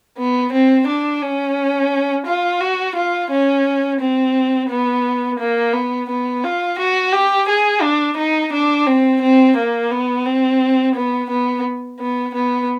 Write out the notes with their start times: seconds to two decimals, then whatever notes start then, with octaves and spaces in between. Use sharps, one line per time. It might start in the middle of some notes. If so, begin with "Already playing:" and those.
0.18 B3
0.52 C4
0.87 D4
1.22 C#4
2.26 F4
2.60 F#4
2.96 F4
3.30 C#4
4.01 C4
4.69 B3
5.40 A#3
5.73 B3
6.09 B3
6.44 F4
6.79 F#4
7.12 G4
7.48 G#4
7.82 D4
8.17 D#4
8.53 D4
8.87 C4
9.21 C4
9.56 A#3
9.91 B3
10.26 C4
10.95 B3
11.30 B3
12.00 B3
12.34 B3